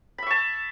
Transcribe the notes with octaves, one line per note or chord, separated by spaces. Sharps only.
E5 A5 B5 C#6